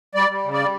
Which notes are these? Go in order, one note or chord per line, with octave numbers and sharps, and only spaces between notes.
G3 D5
G3
C#3
D5
G3